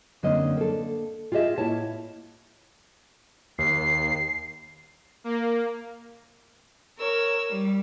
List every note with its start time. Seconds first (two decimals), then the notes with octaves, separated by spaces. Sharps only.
0.23 F#2 D3 A#3 C4 C#5 D#5
0.57 A#3 A4
1.32 F4 G4 G#4 D#5 E5
1.58 A2 A#3 E4 C#5 A5
3.59 D#2 C7
5.24 A#3
6.97 A#4 C#5 E6
7.49 G3